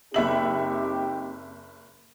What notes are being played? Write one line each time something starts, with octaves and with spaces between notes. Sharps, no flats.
F#1 C4 D#4 G4 E5 F#7